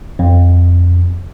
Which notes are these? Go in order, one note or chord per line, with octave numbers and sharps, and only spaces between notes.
F2